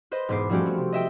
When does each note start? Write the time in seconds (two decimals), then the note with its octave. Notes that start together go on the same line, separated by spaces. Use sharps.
0.11 B4 C5 D#5
0.29 E1 G#2 B3 D6 C7
0.49 F3 G3 A3 C#4 F#4 G4
0.66 A3 C4
0.77 C3
0.92 D#5 E5 G5 E6